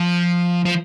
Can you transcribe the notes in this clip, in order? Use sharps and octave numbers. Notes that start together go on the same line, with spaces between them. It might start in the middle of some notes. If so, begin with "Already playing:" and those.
Already playing: F3
F3